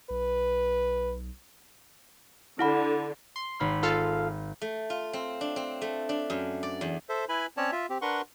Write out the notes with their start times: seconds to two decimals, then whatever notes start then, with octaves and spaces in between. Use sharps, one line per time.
0.10 B1 B4
2.59 D3 E4 F#5 B5
3.36 C6
3.60 G#1 B5 F6
3.83 F4 A4 F5
4.62 A3
4.90 F4
5.13 C4
5.41 D4
5.56 C4
5.82 A3
6.09 D4
6.30 F#2
6.63 D5
6.81 E2
7.09 A4 C5 E5
7.29 E4 B4 G#5 B5
7.57 C4 C#4 C#5 D5 A5
7.72 F4 E5
7.90 C4 G4
8.02 D4 A#4 B4 F#5 C6 C#6